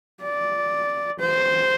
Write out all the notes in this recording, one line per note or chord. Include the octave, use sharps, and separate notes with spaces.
D5
C5